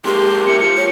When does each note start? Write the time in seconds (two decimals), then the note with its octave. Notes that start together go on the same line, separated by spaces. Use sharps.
0.05 G#3 A#3 G4 C6
0.47 A#3 E4 C#7
0.60 F3 C#7
0.77 C#5